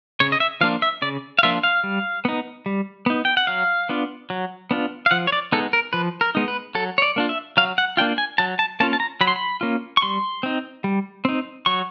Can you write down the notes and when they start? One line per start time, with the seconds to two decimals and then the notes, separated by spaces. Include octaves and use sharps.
0.20 C#3 C#5
0.32 D#5
0.40 E5
0.61 F3 A#3 D4 F4 F5
0.82 E5
1.02 C#3 D5
1.39 F5
1.43 F3 A#3 D4 F4 E5
1.63 F5
1.84 G3
2.25 B3 D#4
2.66 G3
3.06 B3 D#4
3.25 G5
3.37 F#5
3.47 F#3 F5
3.89 B3 D4 F4
4.30 F#3
4.71 B3 D4 F4
5.06 F5
5.11 F3 F#5
5.27 C#5
5.32 D5
5.52 G#3 B3 D#4 A4
5.73 A#4
5.93 F3 B4
6.21 A#4
6.35 G#3 B3 D#4
6.48 B4
6.75 F#3 A4
6.98 C#5
7.02 D5
7.16 A#3 D4 F4
7.29 E5
7.57 F#3 F5
7.78 F#5
7.97 A#3 D4 F4 G5
8.18 G#5
8.38 F#3 A5
8.59 A5
8.80 A#3 C#4 F4 A5
8.93 A5
9.00 A#5
9.21 F#3 B5
9.27 C6
9.36 B5
9.61 A#3 C#4 F4
9.97 C#6
10.02 G3 C6
10.43 C4 D#4
10.84 G3
11.25 C4 D#4
11.66 F#3 C#6